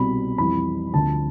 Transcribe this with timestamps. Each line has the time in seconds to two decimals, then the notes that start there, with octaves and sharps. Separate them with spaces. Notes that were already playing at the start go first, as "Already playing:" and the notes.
Already playing: C2 B2 G3 B5
0.38 F2 E3 G3 B5
0.94 D2 D3 F3 A5